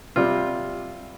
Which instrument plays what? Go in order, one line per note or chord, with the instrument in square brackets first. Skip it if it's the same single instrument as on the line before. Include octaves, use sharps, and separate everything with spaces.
[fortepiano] C3 G3 F4